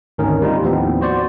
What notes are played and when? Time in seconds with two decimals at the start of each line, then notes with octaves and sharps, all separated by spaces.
0.18 G#1 D2 D#3 C#4 A#4
0.42 G3 C4 D#4 F4
0.62 D#2 A2 F3 B3 C4 D#4
1.01 F#4 C5 D5 C#6